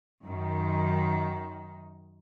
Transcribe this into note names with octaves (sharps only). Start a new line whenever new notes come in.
F#2 D#3